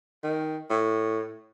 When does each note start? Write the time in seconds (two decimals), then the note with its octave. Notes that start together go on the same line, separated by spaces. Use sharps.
0.23 D#3
0.70 A2